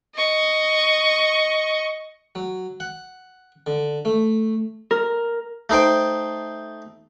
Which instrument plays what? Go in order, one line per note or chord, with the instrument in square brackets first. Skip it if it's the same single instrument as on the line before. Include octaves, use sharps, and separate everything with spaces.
[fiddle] D#5 C#6
[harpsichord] F#3
F#5
D3
A3
[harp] A#4
[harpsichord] A3 D#4 C5 G5